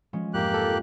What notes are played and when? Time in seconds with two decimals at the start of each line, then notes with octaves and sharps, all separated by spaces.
0.13 F3 G#3 C#4
0.34 F2 G#2 A#3 G4 F#6
0.54 A4